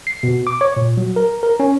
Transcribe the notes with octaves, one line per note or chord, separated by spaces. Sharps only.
C7
B2
D6
C#5
A#2
F#3
A#4
A#4
C#4